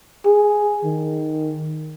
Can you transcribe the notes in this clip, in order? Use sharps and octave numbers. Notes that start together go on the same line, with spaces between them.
G#4
D#3